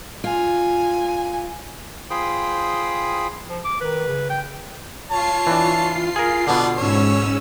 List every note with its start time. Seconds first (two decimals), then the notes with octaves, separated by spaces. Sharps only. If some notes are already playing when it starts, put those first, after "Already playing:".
0.24 F4 G#5
2.10 F4 G#4 C5 G5 B5 D#6
3.49 F3
3.64 D6
3.81 D#3 B4
4.08 C#3
4.30 G5
5.10 F4 C#5 A5 C7
5.47 E3 D4
6.16 G#4 A#4
6.47 B2 D3 B3 D4
6.78 G#2 C#4 C#5 E6